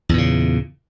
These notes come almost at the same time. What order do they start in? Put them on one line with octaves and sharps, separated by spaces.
E2 A#2 C#3